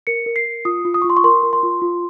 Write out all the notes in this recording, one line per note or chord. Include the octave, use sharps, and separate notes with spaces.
A#4 C#7
A#4
C7
A#4
F4 D#6
F4
D#6
C#6
F4
C6
C#6
A#4 C6
A#4
C6
F4
F4